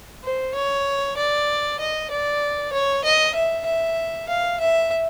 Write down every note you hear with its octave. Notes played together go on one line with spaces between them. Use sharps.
C5
C#5
D5
D#5
D5
C#5
D#5
E5
E5
F5
E5